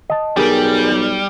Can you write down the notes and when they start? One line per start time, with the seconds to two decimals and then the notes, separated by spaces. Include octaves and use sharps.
0.10 D#5 A5
0.37 B1 G3 G4 G#4 A#4